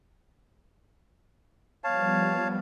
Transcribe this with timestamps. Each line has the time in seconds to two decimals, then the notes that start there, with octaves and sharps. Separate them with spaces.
1.84 F3 G3 B3 C#5 F5 A5